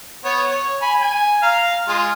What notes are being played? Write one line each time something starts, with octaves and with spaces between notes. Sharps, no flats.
B3 C#5
C#5
G#5 B5
G#5
F5 A#5
G#3 F4